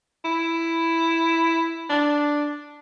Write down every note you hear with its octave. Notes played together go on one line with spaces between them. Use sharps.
E4
D4